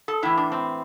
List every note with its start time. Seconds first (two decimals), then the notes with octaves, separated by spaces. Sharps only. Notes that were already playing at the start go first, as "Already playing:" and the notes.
0.08 A4
0.23 A2 E3 E4
0.37 D4
0.52 C4